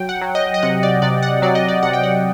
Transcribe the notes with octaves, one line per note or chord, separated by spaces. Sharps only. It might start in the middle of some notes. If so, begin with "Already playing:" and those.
Already playing: F#3 G5
F#5
F#3
D#5
D#5
C3 F#5
D5
C3 D5
F#5
F#3 D5
D#5
D5
C3 F#5
G5
F#5